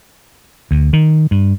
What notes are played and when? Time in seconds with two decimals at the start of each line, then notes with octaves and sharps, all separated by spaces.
0.71 D2
0.93 D#3
1.31 G2